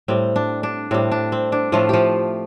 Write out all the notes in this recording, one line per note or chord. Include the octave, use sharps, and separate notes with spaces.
A2 G3 C4
D4
D4
A2 G3 C4
D4
C4
D4
A2 F3 A3 F4
F3 F4 G4